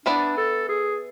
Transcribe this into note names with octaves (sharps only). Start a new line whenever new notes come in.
E3 B3 D4 E4 B4 D5
A4
G#4